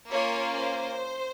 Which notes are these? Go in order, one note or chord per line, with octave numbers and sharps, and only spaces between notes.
A#3 C#4 F4 C#5
C5